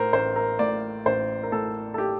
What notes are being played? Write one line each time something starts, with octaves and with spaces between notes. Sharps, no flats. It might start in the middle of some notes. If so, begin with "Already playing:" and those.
Already playing: A2 A#4 C5
A1 C5
A#4
A2 D5
A1 C5
A#4
A2 A4
A4
G4